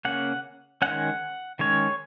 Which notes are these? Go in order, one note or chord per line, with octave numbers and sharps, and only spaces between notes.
C#3 A#3 C#4 F#5
D#3 G#3 C#4 F#5
D#3 G#3 C#4 C#5